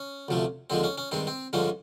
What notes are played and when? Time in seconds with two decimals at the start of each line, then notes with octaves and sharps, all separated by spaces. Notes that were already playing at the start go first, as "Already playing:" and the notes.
Already playing: C#4
0.28 D2 C3 F3 A3
0.70 D#2 D3 F3 G#3 C4
0.84 C#4
0.98 C#4
1.11 G2 D#3 G#3 C4
1.27 C4
1.53 G2 D3 F3 G#3 C#4